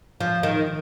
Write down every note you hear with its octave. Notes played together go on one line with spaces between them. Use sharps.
F3
D#3